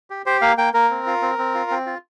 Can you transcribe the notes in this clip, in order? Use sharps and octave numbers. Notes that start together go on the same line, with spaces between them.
G4
G4 C5
A#3 F5
A#3 G5
A#3 A#4
C4
F4
C4
C4
F4
C4
F4